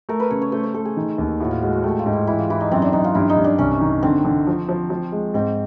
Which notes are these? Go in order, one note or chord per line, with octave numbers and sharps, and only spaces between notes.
A3 A#4
B4
C#3 C#5
C#5
A3 C5
C5
A3 A4
G#4
D#3
D#2
A2 F#4
F4
G#3 F#4
F#4
A3 G4
F4
G#2
E4
E3 E4
F4
E3 E4
D#4
F#2 C4
D4
F#2 D#4
F4
G2 E4
D#4
G2
D4
C2 C#4
D#3
D3 C4
D3
F3
F3
F3
G#3
G#2 C4